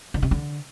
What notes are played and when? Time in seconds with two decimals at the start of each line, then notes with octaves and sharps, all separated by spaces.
0.14 D3
0.22 C3
0.31 D3